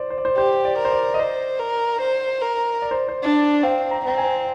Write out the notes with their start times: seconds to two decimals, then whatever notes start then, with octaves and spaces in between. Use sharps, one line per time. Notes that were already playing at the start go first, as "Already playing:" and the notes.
Already playing: C5 D5
0.10 C5
0.18 D5
0.25 C5
0.37 G4 C5
0.65 D5
0.78 A#4
0.85 C5
0.92 D5
1.14 D#5
1.19 C5 D5
1.59 A#4
2.01 C5
2.42 A#4
2.82 D5
2.91 C5
3.09 C5
3.23 D4 D5
3.63 C4 F5
3.91 A#5
4.05 C4 A#5
4.18 G#5